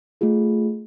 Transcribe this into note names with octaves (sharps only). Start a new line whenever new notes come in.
A3 F4 G#4